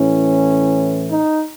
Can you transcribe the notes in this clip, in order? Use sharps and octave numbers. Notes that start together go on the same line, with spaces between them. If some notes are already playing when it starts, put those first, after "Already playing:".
Already playing: A2 E3 C#4
D#4